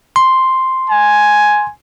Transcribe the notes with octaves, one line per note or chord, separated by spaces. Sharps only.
C6
G#5